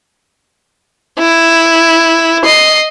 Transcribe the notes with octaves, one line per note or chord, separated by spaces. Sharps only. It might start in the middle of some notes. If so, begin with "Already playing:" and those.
E4
D#5 C7